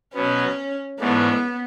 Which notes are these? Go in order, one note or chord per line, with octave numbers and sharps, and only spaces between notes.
B2 F#3 B3 C#4
G#2 E3 A3 B3 D4